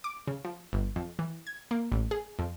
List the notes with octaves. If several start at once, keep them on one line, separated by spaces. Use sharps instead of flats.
D6
C#3
F3
G1
F2
E3
G#6
A#3
A1
G#4
F2